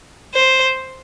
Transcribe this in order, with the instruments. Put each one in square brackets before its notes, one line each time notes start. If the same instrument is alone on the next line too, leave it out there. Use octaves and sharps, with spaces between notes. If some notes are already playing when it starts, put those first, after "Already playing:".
[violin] C5